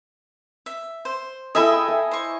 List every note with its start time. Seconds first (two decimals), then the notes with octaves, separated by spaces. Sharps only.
0.66 E5
1.05 C5
1.55 E4 G#4 A4 D#5 E5 G5
1.88 G#5
2.11 C5 C#6